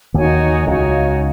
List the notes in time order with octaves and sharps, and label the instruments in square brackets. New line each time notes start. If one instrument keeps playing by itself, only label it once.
[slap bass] D#2 D#3 [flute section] D#4 F#4 C#5 G#5
[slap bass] C#2 C#3 [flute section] D#4 F#4 C#5 G#5